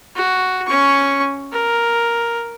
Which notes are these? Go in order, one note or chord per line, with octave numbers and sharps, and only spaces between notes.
F#4
C#4 C#6
A#4